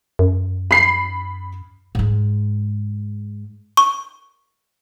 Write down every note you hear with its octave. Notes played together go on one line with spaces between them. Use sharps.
F#2
B5 C7
G#2 G#3
C#6